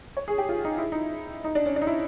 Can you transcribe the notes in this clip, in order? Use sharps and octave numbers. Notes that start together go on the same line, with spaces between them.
C#5
G#4
G4
F4
D#4
E4
D#4
D#4
D4
C#4
D4
D#4
E4